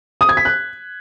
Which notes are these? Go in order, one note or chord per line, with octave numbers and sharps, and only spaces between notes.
D#6
G#6
B6
F#6